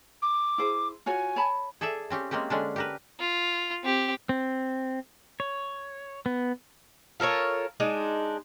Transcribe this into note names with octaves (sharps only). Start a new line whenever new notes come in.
D6
E4 G#4 C5
F4 F#4 C#5 G#5
C#5 A5 B5
G#4 A4 D5 E5
C4 C#4 G4
G#3 A#3 C4 C#4 G4
D3 G#3 C#4 D4
G4 A#4 B4
F4
C4 G4
C4
C#5
B3
F4 A4 A#4 C#5
G#3 D4 D#4